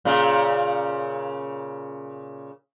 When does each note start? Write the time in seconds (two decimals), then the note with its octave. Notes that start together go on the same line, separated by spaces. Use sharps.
0.05 A#2 C#3